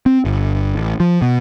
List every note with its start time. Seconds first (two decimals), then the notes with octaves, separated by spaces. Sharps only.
0.06 C4
0.25 G1
0.76 A1
1.00 F3
1.22 B2